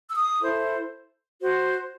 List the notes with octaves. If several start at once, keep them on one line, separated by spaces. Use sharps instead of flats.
E6
D#6
E4 A4 C5
F#4 C5